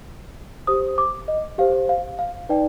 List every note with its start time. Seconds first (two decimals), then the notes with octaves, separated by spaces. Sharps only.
0.67 G4 C5 D#6
0.98 D6
1.28 D#5
1.58 G4 C5 F5
1.89 F5
2.19 F5
2.49 D#4 B4 D5 G5